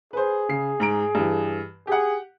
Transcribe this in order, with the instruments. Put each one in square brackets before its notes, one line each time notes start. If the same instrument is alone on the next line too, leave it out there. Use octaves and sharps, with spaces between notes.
[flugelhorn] G#4 [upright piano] B4 C5
[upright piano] C#3 C7
G#2 A#5 D7
G2 E3
[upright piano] G4 F#5 [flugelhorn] G#4